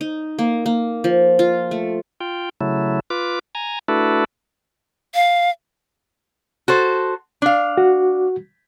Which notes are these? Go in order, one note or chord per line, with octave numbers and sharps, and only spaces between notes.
D#4
A#3
A#3
F3
F4
A3
F4 G5
C#3 F#3 A3 E4
F4 B4 D6
G#5 A#5
A3 D4 E4 F#4 A4 B4
F5
F#4 A4 C5
D4 F5
F#4